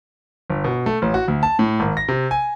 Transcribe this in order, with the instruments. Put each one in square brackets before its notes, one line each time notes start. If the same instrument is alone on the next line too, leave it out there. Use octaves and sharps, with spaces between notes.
[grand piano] G1
B2
A3
A1
F#4
D2
A5
A2
G#1
A#6
C3
G#5